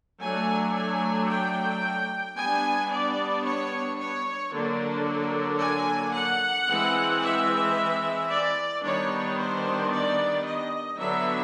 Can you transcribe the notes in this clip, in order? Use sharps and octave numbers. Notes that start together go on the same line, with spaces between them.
F#3 A3 D4 G#5
G#5
G5
G3 B3 D4 G#5
D5
C#5
C#5
D3 F#3 A#3 D4
G#5
F#5
E3 G#3 C4
E5
D5
D#3 G3 B3 D4 C#5
C5
D5
D#5
D3 F#3 B3 D4 E5